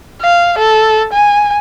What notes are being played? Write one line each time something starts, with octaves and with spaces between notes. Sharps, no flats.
F5
A4
G#5